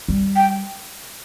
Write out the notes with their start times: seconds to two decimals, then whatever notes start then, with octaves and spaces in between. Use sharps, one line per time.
0.08 G3
0.36 G5